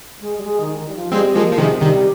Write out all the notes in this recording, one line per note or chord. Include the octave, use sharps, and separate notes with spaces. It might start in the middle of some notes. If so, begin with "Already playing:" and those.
G#3
G3
G#3
D#3
D#3
G3
F3
G3 G#3 C4
F3 G#3 A#3
F3
C3 D#3 G#3
G#3
C3 D#3 G3